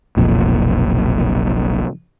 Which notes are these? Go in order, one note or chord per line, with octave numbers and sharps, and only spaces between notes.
F1 B1 F2 A#2